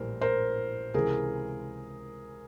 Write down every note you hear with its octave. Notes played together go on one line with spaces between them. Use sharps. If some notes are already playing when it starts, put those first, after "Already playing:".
Already playing: A#1 A2 E3 G3 A#4 C5
A#4 C5
C#2 C3 E3 G#4 A#4